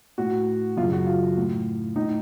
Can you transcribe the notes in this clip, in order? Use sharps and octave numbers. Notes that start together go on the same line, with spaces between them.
A2 F#4
F#2 C#3 F4
F#4
F4
A2
A2 D#4